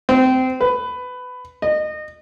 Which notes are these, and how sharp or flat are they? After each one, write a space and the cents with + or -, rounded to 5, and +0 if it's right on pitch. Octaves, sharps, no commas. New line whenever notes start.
C4 -20
B4 +20
D#5 -25